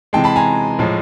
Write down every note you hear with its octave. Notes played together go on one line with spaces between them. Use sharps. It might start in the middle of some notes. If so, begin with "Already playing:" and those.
C3 E3 G#3 G5 A5
A5 B5
G#5 A#5
A2 F3 G#3